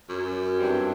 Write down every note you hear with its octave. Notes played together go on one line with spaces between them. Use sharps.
F#2
G2 E3 G3 C4